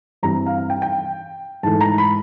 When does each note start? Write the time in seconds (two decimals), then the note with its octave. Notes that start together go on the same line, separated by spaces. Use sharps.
0.23 G2 E3 G3 C4 A#5
0.46 F5
0.58 F5
0.70 G5
0.82 G5
1.63 G#2 E3 A3 A5
1.81 A#5
1.98 B5